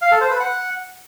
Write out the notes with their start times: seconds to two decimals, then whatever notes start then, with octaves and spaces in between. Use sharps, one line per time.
0.02 F5
0.11 A4
0.21 C5
0.30 B4
0.40 F#5